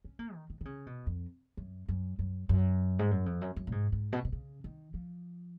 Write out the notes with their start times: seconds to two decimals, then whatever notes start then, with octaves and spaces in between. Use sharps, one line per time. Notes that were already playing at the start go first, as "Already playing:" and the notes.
0.04 C#4
0.19 A#3
0.34 D#3
0.50 D#3
0.61 D#3
0.65 C#3
0.86 B2
1.06 F2
1.57 F#2
1.88 F#2
2.19 F#2
2.49 F#2
2.99 G#2
3.11 F#2
3.26 F2
3.41 F#2
3.56 F#2
3.67 A#2
3.72 G#2
3.92 G#2
4.13 B2
4.25 B2
4.32 C#3
4.64 D#3
4.94 F3